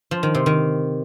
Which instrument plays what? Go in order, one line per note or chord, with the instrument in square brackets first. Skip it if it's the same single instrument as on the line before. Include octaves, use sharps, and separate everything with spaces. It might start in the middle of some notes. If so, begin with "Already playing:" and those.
[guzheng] F3
D#3
C3
D#3